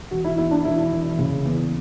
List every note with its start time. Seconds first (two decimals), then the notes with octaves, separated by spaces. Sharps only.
0.11 E1 F#4
0.24 E4
0.38 E2 E4
0.51 D4
0.65 E1 E4
0.91 E1
1.19 C#3
1.46 E2